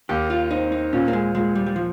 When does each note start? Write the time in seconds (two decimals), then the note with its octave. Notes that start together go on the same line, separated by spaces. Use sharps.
0.09 D#2 G4
0.30 F4
0.51 C4 D#4
0.72 D#4
0.93 A#2 C#4
1.08 A#3
1.13 G#3
1.35 A#2 G#3
1.55 G3
1.66 G3
1.76 F3